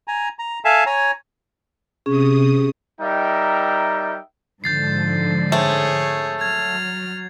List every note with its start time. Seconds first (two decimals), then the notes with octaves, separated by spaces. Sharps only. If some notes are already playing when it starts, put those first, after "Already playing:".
0.08 G#5 A#5
0.39 A#5
0.65 A4 E5 F5 G#5 A5
0.86 C#5 G#5 A#5
2.06 C3 C#4 G#4 D#6
3.01 G3 D#4 A#4 E5 G5 A#5
4.64 G#2 D3 F3 G6 A6 C7
5.52 A3 C4 G#4 C#5
6.41 F#3 F6 G#6